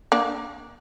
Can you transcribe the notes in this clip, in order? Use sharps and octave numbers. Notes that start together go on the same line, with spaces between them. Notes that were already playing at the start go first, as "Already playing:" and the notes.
A#3 D4